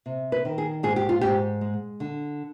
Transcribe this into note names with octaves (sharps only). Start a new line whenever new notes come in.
C3
B4
D#3
G#4
G#2 G#4
G4
F4
G#2 G4
G#3
D3